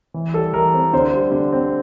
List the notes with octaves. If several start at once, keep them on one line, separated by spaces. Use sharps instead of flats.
E3
G3 A4
E3 A#4
C4
D3 C5
G3
D3
C4